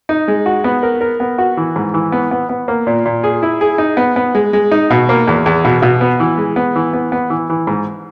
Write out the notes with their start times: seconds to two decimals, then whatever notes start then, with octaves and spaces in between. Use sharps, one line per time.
0.09 D#4
0.28 G#3
0.46 F#4
0.64 B3
0.83 A#4
1.01 A#4
1.20 B3
1.38 F#4
1.57 E3
1.76 G#2
1.94 E3
2.12 B3
2.31 B3
2.49 B3
2.68 A#3
2.87 A#2
3.05 A#2
3.24 G#4
3.42 E4
3.61 G#4
3.78 D#4
3.97 B3
4.16 B3
4.35 G#3
4.53 G#3
4.71 D#4
4.90 B2
5.09 A#3
5.27 E2
5.46 E2
5.65 B2
5.82 B2
6.01 B3
6.20 E3
6.38 G#3
6.56 B3
6.76 E3
6.93 B3
7.12 B3
7.30 E3
7.50 E3
7.67 G#2